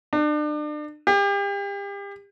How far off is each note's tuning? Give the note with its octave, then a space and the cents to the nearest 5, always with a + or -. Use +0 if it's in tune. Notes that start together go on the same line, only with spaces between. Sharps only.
D4 +35
G4 +35